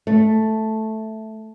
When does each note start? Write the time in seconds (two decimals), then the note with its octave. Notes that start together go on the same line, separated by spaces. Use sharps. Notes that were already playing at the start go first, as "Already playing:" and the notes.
0.07 A3